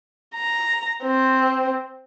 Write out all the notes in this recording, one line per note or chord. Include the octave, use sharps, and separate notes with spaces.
A#5
C4